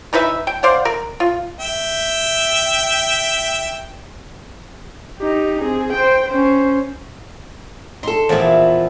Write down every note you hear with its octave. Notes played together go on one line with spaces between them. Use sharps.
E3 D#4 B4 E5
G5
C5 D5 F5 F#5
A#4
F4
E5 G5
D#4 G4
C4 G#4
C5 G5
C#4 C5
D#4 A4 C6
E2 A#2 F3 E4